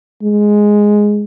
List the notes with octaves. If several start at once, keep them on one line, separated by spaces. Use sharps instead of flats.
G#3